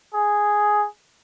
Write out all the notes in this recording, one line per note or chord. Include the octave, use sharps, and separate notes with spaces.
G#4